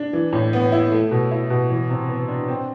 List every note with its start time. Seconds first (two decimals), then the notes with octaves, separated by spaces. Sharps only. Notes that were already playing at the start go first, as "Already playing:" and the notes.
Already playing: D4
0.13 E3
0.33 A2
0.53 B3
0.72 E4
0.91 A3
1.11 B2
1.31 E4
1.50 B2
1.70 E3
1.90 C3
2.09 B3
2.28 D4
2.48 C4